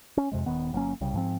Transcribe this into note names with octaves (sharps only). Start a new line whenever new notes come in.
C#4
F2 C3 G#3
D#1 D#3 B3
G1 F#3 A#3 C#4
C2 C#3 G3
G#2 F3 C4